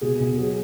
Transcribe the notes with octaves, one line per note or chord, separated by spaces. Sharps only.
B2 G#4
B2
F#3 G#4